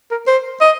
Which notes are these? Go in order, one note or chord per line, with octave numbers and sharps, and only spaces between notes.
A#4
C5
D#5